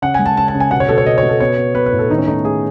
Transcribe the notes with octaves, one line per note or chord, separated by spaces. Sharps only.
C#3 F#5
G#3 G#5
A5
C#3 A5
A5
C#3
G#5
B2 F#5
C#5
B2 A4
C#5
B2 D#5
C#5
B2
A4
B3 C#5
B3
B3 B4
B4
A2
A4
D#3 D#4
C#4
A3 D#4
A3 G#4